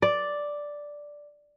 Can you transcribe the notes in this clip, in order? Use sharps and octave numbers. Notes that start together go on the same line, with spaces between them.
D5